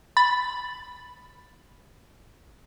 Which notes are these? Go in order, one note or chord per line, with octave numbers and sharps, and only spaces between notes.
B5 A6